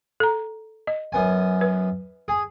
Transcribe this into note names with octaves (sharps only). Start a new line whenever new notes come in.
A4 A#5
D#5
F#2 B3 G#5
B4
G#4